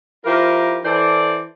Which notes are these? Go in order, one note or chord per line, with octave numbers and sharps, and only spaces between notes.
F3 E4 G4 A#4
E3 A4 C5 D5